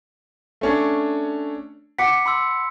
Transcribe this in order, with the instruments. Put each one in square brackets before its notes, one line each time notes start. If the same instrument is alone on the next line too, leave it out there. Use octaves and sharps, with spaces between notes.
[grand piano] A3 C#4 D4
[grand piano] F#5 D6 [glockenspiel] B6 C#7
[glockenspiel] B5 C6 E6